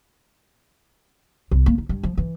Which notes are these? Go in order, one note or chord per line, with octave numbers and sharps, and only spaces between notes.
C2
A#3
D#4
G2
F3
E3